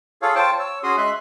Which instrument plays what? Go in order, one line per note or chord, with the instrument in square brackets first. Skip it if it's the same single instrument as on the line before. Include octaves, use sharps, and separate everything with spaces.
[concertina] F4 G#4 A4 C#5 F5
F4 C5 C#5 G5 A5
C#5 E6
C#4 F#4 G#4 C6 D#6
G#3 E5 C6 F#6